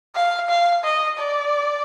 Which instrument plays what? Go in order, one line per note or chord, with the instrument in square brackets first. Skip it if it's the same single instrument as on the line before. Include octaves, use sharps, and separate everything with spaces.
[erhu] F5
F5
D#5
D5